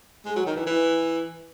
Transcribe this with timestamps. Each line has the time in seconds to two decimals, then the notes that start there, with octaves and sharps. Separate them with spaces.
0.26 G#3
0.36 F#3
0.46 D#3
0.56 E3
0.66 E3